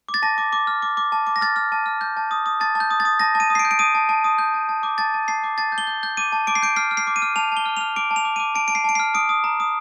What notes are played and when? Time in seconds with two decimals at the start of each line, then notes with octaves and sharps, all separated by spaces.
0.09 D6
0.14 A6
0.23 A5 A#6
0.38 D6
0.53 D6
0.67 F6
0.82 D6
0.97 D6
1.12 A5
1.27 D6
1.36 A#6
1.41 F6 A6
1.56 F6
1.72 A5
1.86 F6
2.01 G6
2.17 A5
2.31 D#6
2.46 D#6
2.60 A5 A6
2.75 A5
2.80 G6
2.91 D#6
3.00 A6
3.05 D#6
3.20 A5 A#6
3.35 A5
3.40 D#7
3.50 D#6
3.55 C7
3.59 D7
3.65 G6
3.71 D7
3.79 D#6 D#7
3.95 A5
4.09 A5
4.24 D#6
4.38 G6
4.54 A5
4.69 A5
4.83 D6
4.98 A5 A6
5.14 A5
5.28 A5 C7
5.44 D6
5.58 A5 A6
5.72 G6
5.78 G7
5.87 G6
6.03 G6
6.17 D6 D#7
6.32 A5
6.47 D6 D7
6.55 C7
6.62 G6 D7
6.76 F6 C7
6.91 F6
6.97 C7
7.07 D6
7.16 D#7
7.22 F6
7.36 A5 F7
7.52 A5 G7
7.66 F6
7.77 F7
7.81 F6
7.96 D6 D7
8.11 A5
8.16 F7
8.25 D6
8.36 D#7
8.40 D6
8.55 A5 D7
8.68 A5 D7
8.75 C7
8.84 A5 D7
8.95 C7
9.00 F6
9.14 D#6 D7
9.29 D#6
9.44 A#5
9.60 D#6